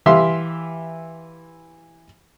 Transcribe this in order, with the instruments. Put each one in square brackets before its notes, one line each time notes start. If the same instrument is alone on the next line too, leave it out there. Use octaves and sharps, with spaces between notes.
[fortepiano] E3 G4 E5 F5 C6